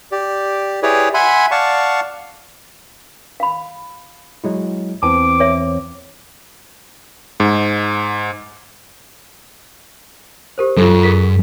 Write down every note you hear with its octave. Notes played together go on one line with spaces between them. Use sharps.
G4 D5
E4 G4 G#4 B4 C#5 D5
E5 F#5 G#5 B5 C6
D5 F5 F#5 A5 C#6
F5 B5
F#3 G#3 E4
E2 E3 C4 A5 D6
C#5 E5
G#2
G4 A#4 C5
F#2 F4 A4
G#4 A#4 B6